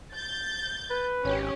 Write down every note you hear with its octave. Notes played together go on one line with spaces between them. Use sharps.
G6 A6
B4
G#1 C#4 G4